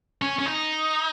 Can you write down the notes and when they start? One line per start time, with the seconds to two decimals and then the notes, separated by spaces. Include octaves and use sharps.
0.22 C#4
0.39 C#4
0.46 D#4